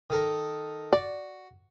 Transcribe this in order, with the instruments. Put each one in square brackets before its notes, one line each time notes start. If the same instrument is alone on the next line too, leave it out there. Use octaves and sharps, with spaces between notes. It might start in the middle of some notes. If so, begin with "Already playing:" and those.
[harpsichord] D#3 A4 A#4
[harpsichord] F#4 [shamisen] D5